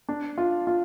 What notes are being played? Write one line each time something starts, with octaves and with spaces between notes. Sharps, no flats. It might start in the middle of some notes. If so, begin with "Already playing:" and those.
D4
F4
F4